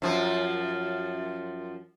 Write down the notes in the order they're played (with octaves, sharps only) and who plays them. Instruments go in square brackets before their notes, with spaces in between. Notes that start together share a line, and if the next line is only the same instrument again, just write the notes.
[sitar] F#2 F3